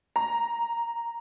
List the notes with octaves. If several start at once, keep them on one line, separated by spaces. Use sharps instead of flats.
A#5